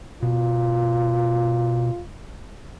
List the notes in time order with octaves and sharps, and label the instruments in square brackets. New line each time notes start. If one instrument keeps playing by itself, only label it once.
[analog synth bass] B2 [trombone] F4